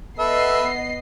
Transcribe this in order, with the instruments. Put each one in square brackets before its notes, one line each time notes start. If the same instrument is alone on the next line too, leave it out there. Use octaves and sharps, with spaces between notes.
[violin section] B3 D#5 C7 [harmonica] A4 B4 E5